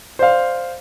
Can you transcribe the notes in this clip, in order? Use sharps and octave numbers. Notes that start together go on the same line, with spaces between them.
C5 D5 F5